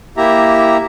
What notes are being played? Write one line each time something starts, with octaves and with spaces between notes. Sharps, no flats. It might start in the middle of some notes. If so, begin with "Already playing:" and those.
A#3 E4 G4 E5 A#5